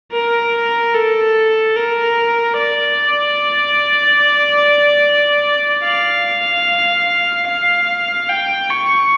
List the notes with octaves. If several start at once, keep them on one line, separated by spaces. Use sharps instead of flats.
A#4
A4
A#4
D5
F5
F5
G5
C#6